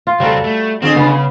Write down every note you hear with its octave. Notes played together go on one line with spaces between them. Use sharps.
F4
C#2 G3 C4 F#4 A4
A3
D3 C4 F4 G#4
C#3 B3